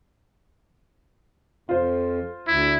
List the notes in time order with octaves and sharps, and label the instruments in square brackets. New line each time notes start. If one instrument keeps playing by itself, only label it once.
[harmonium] F2 [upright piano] F4 C5
[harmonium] D2 [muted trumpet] E4